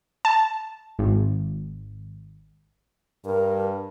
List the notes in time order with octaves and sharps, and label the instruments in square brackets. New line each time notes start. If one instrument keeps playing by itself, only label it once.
[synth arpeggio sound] A5
G#1
[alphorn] G2 [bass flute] A#4